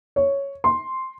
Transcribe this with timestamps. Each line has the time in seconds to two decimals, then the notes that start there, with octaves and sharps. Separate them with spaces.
0.16 C#5
0.64 C6